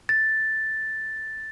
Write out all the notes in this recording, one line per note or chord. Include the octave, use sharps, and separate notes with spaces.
A6